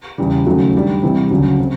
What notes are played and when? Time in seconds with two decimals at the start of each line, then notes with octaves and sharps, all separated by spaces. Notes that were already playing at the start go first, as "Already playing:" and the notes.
0.18 E2 C#3 E3 G3
0.46 D#2 C#3 F#3 A3
0.75 G2 D#3 G3
1.03 C3 E3 G3 C4
1.31 D2 C#3 F#3
1.60 C3